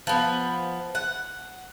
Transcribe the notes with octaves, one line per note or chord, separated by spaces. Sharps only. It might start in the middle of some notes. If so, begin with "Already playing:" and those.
F3 B3
F#5